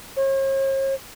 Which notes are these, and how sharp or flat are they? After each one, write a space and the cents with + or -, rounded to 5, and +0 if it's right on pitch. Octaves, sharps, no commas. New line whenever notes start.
C#5 -45